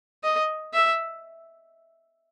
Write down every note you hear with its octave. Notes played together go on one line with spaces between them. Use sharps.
D#5
E5